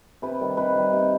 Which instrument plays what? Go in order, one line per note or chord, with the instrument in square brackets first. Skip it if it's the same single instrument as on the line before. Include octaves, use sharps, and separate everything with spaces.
[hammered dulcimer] C3 B4
D#3 G3
C3 B4
D#3 G3
C3